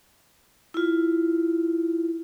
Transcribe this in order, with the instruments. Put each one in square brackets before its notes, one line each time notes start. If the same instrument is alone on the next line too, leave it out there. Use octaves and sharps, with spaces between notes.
[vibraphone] E4 F4